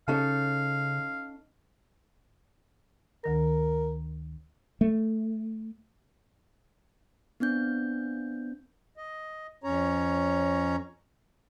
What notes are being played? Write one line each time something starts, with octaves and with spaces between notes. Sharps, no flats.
C#3 C#4 D#4 A4 F5
D2 D#3 A#4 A#6
A3
B3 C4 D4 G6
D#5
F2 C#4 C#5 A#5